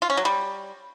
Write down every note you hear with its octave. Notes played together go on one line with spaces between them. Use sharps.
F4
C#4
F#3
G3